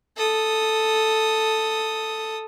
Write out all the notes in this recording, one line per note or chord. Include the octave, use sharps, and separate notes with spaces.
A4 D#6